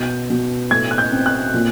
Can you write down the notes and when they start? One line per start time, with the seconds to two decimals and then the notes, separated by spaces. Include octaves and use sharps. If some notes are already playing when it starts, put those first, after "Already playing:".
Already playing: B2 G6
0.30 B2
0.71 A2 G#6
0.91 F#6
0.98 G6
1.12 C4
1.26 F#6
1.54 A#2